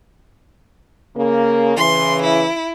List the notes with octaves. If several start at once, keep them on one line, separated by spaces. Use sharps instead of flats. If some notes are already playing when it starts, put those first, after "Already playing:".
C#3 A#3
C#3 E3 C6
E4